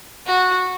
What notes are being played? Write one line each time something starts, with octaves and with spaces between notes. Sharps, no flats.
F#4